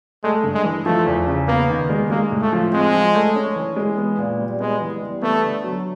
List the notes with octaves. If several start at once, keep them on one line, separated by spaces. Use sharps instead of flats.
G#3 A3
G2
G#3
E3
F3 A3
E2
C#3
A#3 B3
D#3
G#3
G#3 A#3
A2
A3
F3
G#3 C4
F3
A3
C#4
E3
G#3
B3
A#2
G3
G#3 B3
E3
G3
A3 B3
D3
F#3